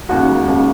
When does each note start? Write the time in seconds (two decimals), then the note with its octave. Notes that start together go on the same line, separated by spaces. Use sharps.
0.09 D#2 C#3 F#4 F#5
0.28 E1
0.47 D#2 C#3